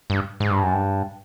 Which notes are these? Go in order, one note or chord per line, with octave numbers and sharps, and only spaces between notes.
G2
G#2
G2
F#2
G2